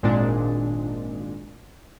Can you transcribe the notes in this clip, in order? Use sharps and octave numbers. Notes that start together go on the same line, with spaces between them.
G#1 A#2 G#3 D4